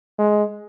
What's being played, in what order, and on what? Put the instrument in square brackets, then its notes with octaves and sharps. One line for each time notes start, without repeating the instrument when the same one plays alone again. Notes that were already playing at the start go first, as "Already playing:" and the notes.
[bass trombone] G#3